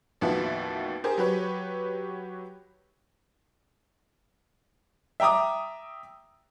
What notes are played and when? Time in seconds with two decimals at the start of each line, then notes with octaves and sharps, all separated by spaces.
0.21 A1 D#2 F3 B3 F#4 E5
1.04 G4 G#4 A#4 C5
1.18 F#3 G4 B4 C#5
5.20 E5 G5 A#5 D6 D#6